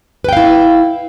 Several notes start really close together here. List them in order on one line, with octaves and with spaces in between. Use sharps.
B4 G5 F5 E4